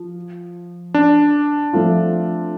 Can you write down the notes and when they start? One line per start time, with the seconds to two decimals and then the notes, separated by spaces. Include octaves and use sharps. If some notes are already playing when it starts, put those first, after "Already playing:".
Already playing: F3
0.94 D4
1.73 F3 A3 C4 F4